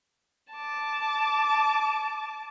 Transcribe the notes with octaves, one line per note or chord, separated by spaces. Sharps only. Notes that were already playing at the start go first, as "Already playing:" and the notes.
A5 D6